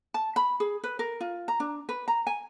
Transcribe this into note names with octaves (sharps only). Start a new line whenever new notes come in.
A5
B5
G#4
B4
A#4
F4
A#5
D4
B4
A#5
G#5